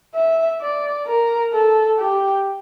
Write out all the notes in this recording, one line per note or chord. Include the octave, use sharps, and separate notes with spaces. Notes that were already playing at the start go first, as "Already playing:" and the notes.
E5
D5
A#4
A4
G4